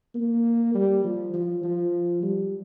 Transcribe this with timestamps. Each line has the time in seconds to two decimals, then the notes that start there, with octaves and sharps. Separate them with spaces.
0.15 A#3
0.74 G3
1.04 F3
1.34 F3
1.63 F3
2.23 G3